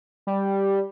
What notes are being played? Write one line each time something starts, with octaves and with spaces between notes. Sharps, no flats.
G3